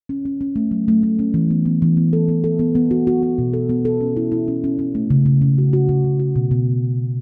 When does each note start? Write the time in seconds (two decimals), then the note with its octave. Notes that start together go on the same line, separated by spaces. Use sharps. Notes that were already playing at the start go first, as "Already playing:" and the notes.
0.09 C#4
0.25 C#4
0.41 C#4
0.56 A3
0.71 F#3
0.88 A3
1.03 A3
1.19 C#4
1.34 E3
1.50 B3
1.66 B3
1.82 E3
1.97 B3
2.13 A4
2.28 B3
2.44 A4
2.59 B3
2.75 B3
2.91 F#4
3.07 F#4
3.23 F#4
3.38 B2
3.53 A4
3.69 B3
3.85 A4
4.01 C#4
4.17 E4
4.32 E4
4.48 C#4
4.64 C#4
4.79 C#4
4.95 A3
5.10 C#3
5.26 C#3
5.42 C#3
5.58 F#4
5.73 F#4
5.89 C#3
6.04 C#3
6.20 F#4
6.36 B2
6.51 B2